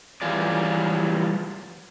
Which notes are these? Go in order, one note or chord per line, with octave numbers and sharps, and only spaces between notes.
E3 F#3 G3 F4 G#4 D5